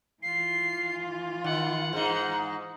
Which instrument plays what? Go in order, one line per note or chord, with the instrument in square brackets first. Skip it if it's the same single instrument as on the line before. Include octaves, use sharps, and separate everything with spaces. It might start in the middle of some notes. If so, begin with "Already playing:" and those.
[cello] E3 F4 [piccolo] C7
[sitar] D#3 [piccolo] F#5
[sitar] G#2 G#3 D#4